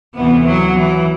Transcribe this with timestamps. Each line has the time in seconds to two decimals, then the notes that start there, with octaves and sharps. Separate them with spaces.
0.15 D2 C3 E3 B3
0.46 F#3
0.75 E3